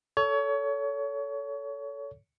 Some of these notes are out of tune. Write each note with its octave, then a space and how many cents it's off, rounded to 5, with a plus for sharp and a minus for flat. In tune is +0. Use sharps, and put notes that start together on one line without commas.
A4 +0 C#5 +30